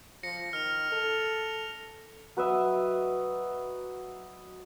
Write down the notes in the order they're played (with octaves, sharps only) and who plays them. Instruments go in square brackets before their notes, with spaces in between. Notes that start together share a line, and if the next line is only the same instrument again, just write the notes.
[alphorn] F3 [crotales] A#6 C#7
[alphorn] D#3 [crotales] F6 F7
[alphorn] A4 [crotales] F7
[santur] F#3 B4 D#5 E5